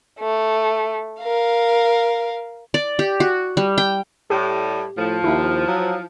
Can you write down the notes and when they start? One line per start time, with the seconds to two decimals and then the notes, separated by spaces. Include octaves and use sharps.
0.19 A3
1.23 A#4 F5
2.74 D5
2.99 G4
3.20 F#4
3.57 G3
3.78 G5
4.30 A2 G3 G4
4.97 A2 F3
5.24 D#2 E4
5.67 F#3